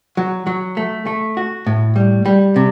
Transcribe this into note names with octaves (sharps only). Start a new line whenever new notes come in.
F#3
F#3
A3
A3
F#4
A2
G3
G3
C3